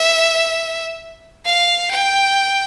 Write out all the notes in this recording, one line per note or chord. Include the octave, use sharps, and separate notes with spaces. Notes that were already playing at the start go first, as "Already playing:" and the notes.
Already playing: E5
F5
G5